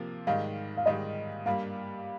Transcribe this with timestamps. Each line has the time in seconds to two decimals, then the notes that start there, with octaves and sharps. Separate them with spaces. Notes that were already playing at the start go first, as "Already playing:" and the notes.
Already playing: C3 F3 A#3 F4
0.27 G#2 D#3 G3 F5
0.77 F5
0.86 G#2 D#3 G3 D#5
1.46 G2 G3 A#3 F5